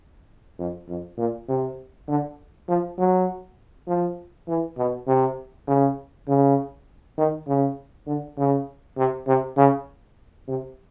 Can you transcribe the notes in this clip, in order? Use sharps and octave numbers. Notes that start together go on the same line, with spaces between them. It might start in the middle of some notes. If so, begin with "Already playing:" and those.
F2
F2
A#2
C3
D3
F3
F#3
F3
E3
B2
C3
C#3
C#3
D#3
C#3
D3
C#3
C3
C3
C#3
C3